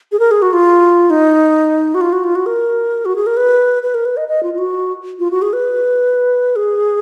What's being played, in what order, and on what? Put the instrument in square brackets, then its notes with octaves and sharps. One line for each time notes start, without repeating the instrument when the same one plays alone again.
[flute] G#4
A#4
G#4
F#4
F4
D#4
F#4
F4
F#4
F4
F#4
A#4
F#4
G#4
A#4
B4
B4
A#4
B4
D#5
D#5
F4
F4
F#4
F4
F#4
G#4
B4
G#4